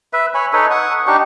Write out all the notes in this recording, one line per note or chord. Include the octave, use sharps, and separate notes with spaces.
B4 E5
C#5 G#5 B5
D#4 A4 B4 C#5
F#5 C#6 D#6
D4 D#4 G4 C#6